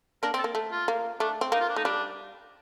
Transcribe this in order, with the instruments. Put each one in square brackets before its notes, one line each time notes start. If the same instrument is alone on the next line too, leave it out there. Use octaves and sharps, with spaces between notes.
[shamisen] A#3 D4 [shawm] A#4
[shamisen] C4
[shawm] A4
[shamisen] A#3
A3
[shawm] F4
[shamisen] A#3
[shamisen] A3 [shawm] D4
[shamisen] C4
[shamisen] A#3 [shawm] D#4
[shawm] F4
D4
[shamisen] A3 [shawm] D#4
[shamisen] G3 [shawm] D4